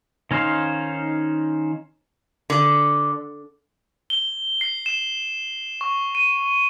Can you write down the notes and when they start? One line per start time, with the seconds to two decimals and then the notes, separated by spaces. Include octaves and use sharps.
0.31 D#3 C#4 D#4 C5 F5
2.50 D3
4.10 G7
4.61 C7
4.86 E7
5.81 C#6
6.15 D#7